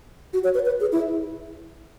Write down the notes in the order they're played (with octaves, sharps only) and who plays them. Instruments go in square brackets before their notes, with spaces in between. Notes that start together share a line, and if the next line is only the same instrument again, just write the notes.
[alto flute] F#4
C#5
B4
B4
G#4
E4